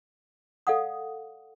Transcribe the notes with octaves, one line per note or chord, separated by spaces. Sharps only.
A4 D5 F5 F#5 D#6